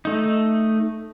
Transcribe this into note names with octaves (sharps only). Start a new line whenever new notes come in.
A3 D#4